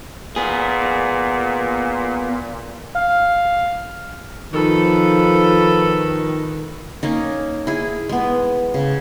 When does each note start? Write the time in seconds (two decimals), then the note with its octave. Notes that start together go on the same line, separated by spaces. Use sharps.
0.36 A#2 B3 G#4
2.95 F5
4.53 D#3 F3 A4 B4
7.03 A#3 C#4 D#4
7.67 E4 G#4
8.09 G#3 B3
8.74 C#3